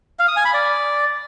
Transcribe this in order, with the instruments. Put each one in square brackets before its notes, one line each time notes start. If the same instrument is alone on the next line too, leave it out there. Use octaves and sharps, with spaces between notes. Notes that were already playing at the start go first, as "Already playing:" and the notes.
[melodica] F5
D#6
G#5
B5
D5